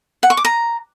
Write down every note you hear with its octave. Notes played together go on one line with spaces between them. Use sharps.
F#5
C#6
D6
A#5